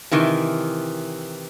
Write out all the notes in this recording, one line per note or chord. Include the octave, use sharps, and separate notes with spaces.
C3 D#3 E3